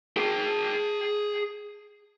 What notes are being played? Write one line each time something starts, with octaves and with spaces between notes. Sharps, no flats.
G#4 G5